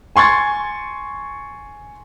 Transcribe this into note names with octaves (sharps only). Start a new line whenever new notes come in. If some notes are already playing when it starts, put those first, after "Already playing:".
G#5 C6 C#6 G#6 A6